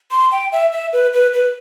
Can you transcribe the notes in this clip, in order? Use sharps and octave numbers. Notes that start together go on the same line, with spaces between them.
C6
G5
E5
E5
B4
B4
B4